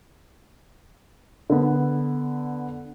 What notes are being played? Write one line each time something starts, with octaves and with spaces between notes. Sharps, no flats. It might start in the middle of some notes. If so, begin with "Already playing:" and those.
D3 B3